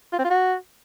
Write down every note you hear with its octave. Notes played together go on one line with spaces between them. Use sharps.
F4
C4
F4
F#4